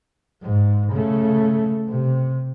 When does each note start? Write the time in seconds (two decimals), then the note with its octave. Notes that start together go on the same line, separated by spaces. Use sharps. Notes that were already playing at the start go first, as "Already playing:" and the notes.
0.42 G#2
0.93 C#3 A3
1.89 C3